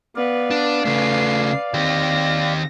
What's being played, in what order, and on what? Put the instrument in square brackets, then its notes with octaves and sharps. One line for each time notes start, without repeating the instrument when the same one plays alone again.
[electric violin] B3 B4 [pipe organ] D5 F5
[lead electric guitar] D4
[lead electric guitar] C#3 A3 [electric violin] B4 C7
[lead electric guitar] D#3 G4 [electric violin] C4 A#6